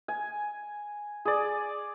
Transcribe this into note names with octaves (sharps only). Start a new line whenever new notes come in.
G#5
G#4 D5